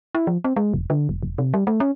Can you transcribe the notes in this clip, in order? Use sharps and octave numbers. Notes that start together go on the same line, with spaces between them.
E4
F3
C4
G#3
E1
D3
F1
E1
C3
G3
A3
C#4